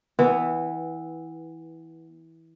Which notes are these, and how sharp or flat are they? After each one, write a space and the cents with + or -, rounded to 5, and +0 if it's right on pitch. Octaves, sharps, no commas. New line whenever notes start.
E3 -15 B3 +0